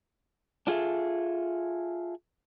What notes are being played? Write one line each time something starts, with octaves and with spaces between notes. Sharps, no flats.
D4 F4 G#4 A4 E5